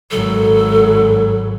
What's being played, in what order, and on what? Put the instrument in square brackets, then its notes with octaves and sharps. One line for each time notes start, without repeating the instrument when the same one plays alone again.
[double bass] G#1 F#3 [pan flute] A4